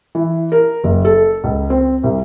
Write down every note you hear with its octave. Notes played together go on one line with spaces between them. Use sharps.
E3
A#4
F#1
A4
C#2
C4
C2